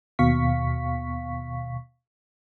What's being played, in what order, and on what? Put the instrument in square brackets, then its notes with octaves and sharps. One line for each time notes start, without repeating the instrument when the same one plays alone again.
[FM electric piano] D#2 B2 F5 C#6 B6